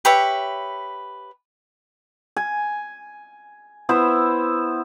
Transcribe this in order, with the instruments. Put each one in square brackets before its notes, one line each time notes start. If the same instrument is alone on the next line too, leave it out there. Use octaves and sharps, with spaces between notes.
[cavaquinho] G4 B4 C#5 E5
[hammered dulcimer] G#5
B3 E4 C5 E5